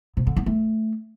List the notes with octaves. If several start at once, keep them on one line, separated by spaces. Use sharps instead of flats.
C3
D3
B3
A3